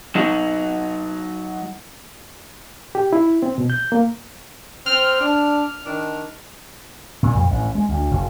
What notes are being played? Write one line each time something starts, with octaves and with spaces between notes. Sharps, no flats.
F#3 D#4 F#4
G4
E4
C4
B2
G6
A#3
C4 F6
D4
D#3 D4
A#2
F2
A1
G#3
D2
F#1